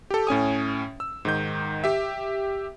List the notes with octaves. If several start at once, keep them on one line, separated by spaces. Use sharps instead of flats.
G4 A4
A2 C#4 G#5 D#6
E6
G#2 D#3 G6
G4 E5